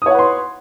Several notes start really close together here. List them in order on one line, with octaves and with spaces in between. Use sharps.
D#6 C#5 F#5 B4 C6